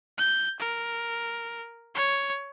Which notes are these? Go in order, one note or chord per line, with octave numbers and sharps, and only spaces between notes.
G6
A#4
C#5